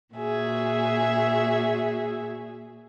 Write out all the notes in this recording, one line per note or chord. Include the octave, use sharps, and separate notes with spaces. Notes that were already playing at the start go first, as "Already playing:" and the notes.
A#2 F#4 G#4 E5